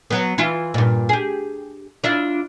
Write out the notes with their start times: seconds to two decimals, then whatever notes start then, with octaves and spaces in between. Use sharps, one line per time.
0.10 F#3 B3
0.38 E3 E4 F4
0.74 G2 A#2
1.09 G4 G#4
2.04 D4 E4 F4